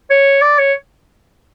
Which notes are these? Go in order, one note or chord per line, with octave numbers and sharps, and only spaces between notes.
C#5
D5
C#5